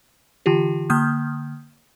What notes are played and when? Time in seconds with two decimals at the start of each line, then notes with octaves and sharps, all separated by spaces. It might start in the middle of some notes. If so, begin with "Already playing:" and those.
0.46 D3 E3 F4 G4
0.90 D3 A#3 D#6 F6 G6